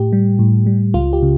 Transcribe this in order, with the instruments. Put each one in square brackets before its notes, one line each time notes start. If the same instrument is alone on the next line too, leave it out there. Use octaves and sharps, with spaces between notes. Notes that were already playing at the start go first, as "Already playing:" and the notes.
Already playing: [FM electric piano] A2 G4
G3
A2
G3
C#2 F4
G4
C#3